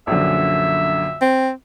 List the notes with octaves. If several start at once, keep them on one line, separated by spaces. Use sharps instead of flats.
A#1 F#2 D3 E5
C4